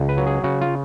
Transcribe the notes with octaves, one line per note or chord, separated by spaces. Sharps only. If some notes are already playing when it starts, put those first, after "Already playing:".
Already playing: C#2
B4
F#3
G#4
C#3 F#4
F4